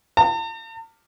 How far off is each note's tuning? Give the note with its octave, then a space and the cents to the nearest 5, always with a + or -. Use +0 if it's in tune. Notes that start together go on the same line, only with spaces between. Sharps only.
A5 +45